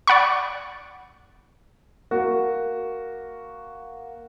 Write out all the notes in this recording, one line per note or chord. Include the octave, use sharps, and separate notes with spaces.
D5 F#5 B5 C#6
A#3 F#4